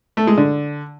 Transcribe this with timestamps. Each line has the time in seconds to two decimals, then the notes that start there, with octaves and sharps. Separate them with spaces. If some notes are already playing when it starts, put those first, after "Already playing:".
0.17 A3
0.27 G#3
0.38 D3